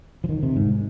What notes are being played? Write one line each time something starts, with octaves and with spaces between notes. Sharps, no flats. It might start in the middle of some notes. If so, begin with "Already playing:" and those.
F3
D#3
C3
G#2